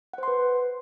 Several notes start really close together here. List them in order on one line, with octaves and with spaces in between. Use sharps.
F#5 C5 C6 B4